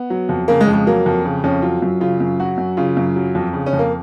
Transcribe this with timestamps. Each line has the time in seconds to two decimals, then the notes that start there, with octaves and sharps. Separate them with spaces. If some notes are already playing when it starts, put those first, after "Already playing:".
Already playing: B3
0.10 F#3
0.29 F2
0.48 C#3 A#3
0.61 G#3
0.68 F2
0.74 G#3
0.87 F#3 A#3
1.06 F2
1.25 C#3
1.44 F2 C#4
1.62 F#3 F4
1.82 F#2
2.00 C#3 F4
2.20 F#2
2.39 F#3 F#4
2.58 F#2
2.77 C#3 F4
2.97 F#2
3.16 F#3
3.35 F2
3.53 C#3
3.66 C#4
3.73 F2
3.79 A#3